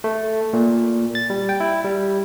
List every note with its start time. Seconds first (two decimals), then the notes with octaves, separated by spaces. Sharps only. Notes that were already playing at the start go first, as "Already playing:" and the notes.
0.04 A3
0.53 A#2
1.15 A6
1.30 G3
1.49 G5
1.60 E4
1.84 G3